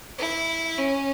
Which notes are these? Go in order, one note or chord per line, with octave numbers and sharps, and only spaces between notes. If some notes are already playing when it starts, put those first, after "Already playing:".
E4
C#4